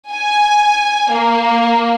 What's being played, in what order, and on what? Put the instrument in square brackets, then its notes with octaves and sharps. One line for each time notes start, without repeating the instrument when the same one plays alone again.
[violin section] G#5
A#3